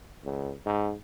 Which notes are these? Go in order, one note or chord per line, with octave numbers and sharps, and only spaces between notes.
C#2
G#2